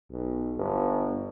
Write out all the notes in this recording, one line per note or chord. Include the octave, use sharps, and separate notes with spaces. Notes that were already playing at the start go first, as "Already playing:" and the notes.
B1
G1